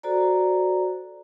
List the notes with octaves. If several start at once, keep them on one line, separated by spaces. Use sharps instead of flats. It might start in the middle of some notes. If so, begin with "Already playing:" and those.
F#4 A4 C5 D5 A#5